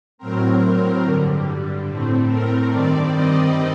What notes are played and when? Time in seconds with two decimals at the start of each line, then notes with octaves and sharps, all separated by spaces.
0.18 A2 F#3 C4 A#4
1.03 G2 D3 G3
1.86 A2 A3 C4
2.28 A#4
2.70 G2 D#3 G3 C4 D5
3.12 D#5